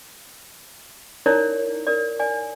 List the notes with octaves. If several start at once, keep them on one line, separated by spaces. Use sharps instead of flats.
D#4 E4 A#4 C#5 D5
A#4 D5
D5 G#5